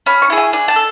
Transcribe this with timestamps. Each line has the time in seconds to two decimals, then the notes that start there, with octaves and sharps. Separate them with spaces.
0.06 C#4 B5
0.22 C#6
0.30 E4 G#4
0.38 G#5
0.53 D4 G#5
0.68 A5
0.76 A4